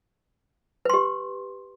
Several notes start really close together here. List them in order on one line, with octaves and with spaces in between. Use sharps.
B4 C6 G4